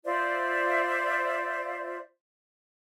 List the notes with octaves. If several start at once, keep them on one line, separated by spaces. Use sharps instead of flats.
F4 C5 D5 E5